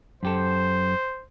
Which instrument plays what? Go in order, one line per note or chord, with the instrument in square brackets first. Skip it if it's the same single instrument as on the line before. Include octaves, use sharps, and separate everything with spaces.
[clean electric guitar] F#2 G4 A4 [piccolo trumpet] C5